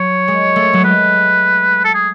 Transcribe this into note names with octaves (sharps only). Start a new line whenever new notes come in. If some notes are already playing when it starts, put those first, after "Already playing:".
Already playing: F#3 C#5
G#3
A3
F#3
G#3 B4
A4
G#4